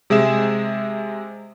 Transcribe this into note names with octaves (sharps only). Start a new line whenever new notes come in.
C3 G#3 G#4 E5 E7